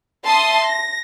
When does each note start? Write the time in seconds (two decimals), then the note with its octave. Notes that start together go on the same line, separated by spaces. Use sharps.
0.25 E5 A5 C6 D#6
0.67 A#6